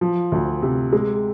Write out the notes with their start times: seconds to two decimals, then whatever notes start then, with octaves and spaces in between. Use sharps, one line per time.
0.01 F3
0.32 D2
0.62 C3
0.93 G#3